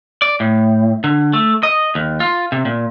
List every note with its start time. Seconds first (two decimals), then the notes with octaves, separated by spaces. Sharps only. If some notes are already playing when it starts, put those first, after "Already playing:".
0.22 D5
0.40 A2
1.04 D3
1.33 A3
1.63 D#5
1.95 D#2
2.20 F4
2.52 C3
2.65 A#2